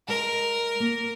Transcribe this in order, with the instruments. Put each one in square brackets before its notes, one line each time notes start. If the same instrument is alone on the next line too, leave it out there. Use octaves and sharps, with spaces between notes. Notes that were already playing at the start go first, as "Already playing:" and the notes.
[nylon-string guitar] G#3 [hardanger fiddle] A#4
[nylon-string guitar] A#3